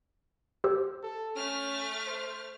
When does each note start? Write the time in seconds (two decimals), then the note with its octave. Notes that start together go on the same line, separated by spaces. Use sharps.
0.64 G4 C5 E6
1.03 A4
1.36 A3 C#4 F6
2.06 C5